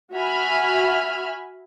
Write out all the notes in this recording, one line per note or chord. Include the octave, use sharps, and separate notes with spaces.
F#4 E5 G#5 B5 F6